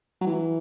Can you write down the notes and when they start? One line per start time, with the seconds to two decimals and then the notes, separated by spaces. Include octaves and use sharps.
0.21 F#3
0.26 E3